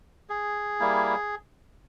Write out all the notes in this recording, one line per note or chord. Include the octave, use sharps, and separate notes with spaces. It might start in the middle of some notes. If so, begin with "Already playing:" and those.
G#4
G3 A#3 E4